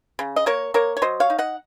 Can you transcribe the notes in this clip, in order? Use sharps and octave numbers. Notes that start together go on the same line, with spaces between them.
C#3
D#5
A#3 A#4 C#5
A#3 A#4 C#5
C#5
F#3 C5 D#5
C#5 F5
D#4
D#5 F#5